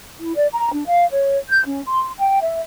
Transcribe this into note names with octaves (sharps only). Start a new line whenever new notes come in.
E4
D5
A#5
D4
F5
C#5
G6
C#4
C6
G5
E5